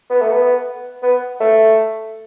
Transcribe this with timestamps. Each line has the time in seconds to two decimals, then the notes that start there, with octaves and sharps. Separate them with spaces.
0.10 B3
0.21 A3
0.32 B3
1.03 B3
1.40 A3